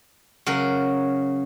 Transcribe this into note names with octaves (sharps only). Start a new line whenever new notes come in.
C#3 F#3 A#4